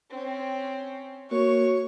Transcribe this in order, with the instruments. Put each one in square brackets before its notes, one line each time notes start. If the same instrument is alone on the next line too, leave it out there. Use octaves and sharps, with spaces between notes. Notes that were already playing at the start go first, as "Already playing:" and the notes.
[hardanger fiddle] C4 C#4
[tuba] A#3 [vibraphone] F#4 [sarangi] C#5 [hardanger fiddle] C#6